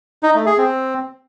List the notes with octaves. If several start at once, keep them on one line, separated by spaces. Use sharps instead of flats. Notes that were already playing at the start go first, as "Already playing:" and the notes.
D#4
A3
G#4
C4